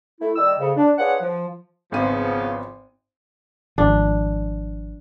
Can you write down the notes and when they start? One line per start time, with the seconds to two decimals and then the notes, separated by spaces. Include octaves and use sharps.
0.20 A3 E4
0.36 D#3 G3 D5 D#5 E6
0.60 F2 C#3
0.76 D4
0.98 D4 F4 G#4 B4 C#5 F#5
1.21 F3
1.92 G#1 C#3 F3 B3 D#7
3.78 G#1 F3 D4